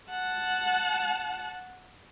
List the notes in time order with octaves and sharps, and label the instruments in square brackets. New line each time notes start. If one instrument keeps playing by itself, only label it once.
[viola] F#5 A5